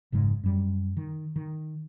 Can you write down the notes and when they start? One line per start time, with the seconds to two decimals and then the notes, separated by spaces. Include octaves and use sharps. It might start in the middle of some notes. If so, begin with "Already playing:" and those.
0.12 F1 G#2 C#3 G#3
0.43 F#2 G3
0.97 D#3
1.36 D#3